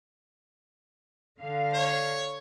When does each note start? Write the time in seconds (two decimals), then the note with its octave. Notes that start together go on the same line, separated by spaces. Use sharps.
1.40 D3 F5
1.74 C#5